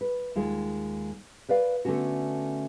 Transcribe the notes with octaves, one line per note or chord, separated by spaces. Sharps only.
B4
D#2 G#3 F4
A#4 B4 D5 F5
D3 A3 B3 C#4 F#4